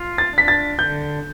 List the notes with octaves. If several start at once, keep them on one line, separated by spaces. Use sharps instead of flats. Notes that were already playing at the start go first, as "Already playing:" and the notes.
Already playing: F4
A6
D4 B6
A6
D3 G6